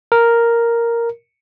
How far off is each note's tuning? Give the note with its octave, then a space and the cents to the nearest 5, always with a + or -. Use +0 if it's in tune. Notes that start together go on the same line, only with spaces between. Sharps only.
A#4 +0